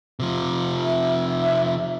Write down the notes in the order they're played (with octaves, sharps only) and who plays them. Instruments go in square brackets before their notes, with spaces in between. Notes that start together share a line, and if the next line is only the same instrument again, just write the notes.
[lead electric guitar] C3 F3
[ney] E5